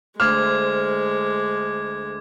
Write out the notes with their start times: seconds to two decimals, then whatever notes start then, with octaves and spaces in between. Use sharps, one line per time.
0.20 D2 G#3 C5 D6 F6 G#6